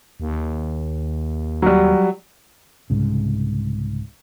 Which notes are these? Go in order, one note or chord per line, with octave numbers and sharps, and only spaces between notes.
D#2
F#3 G3
C2 G#2 C#3